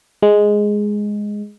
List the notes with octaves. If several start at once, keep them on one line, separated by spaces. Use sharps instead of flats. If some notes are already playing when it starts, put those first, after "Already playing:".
G#3